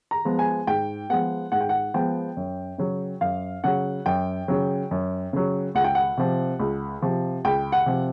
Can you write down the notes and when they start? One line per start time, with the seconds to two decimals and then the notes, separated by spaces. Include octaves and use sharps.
0.11 A#5
0.25 F3 G#3 B3
0.39 G#5
0.67 G#2 G5
1.09 F3 G#3 B3 F#5
1.52 G#2 F#5
1.61 G5
1.69 F#5
1.94 F3 G#3 B3 G5
2.37 F#2
2.78 C#3 F#3
3.21 F#2 F5
3.64 C#3 F#3 F#5
4.06 F#2 G5
4.48 C#3 F#3
4.91 F#2
5.33 C#3 F#3
5.75 C#2 F#5
5.84 G5
5.95 F#5
6.17 C3 F3
6.60 C#2
7.02 C3 F3
7.45 C#2 G5
7.72 F#5
7.86 C3 F3